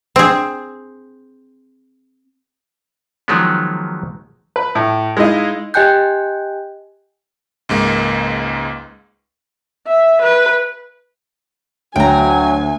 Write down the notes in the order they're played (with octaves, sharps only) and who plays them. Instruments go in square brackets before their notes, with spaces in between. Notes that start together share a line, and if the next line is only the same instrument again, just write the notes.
[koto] C4 G#4
[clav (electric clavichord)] D#3 F3 F#3 G#3 B3
[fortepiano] B4
A2
G#3 D#4 E4 D#5 F5
[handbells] G4 D#5 G5 G#5 F#6 G6
[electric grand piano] C#2 G#2 G#3 A#3
[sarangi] E5
B4
[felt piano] D2 [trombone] F#3 [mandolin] G5 A#5 [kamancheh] G#5